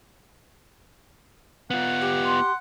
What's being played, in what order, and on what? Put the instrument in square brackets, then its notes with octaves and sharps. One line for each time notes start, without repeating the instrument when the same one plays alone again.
[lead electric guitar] B3 F4 [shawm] F#5
[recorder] G4
[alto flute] C6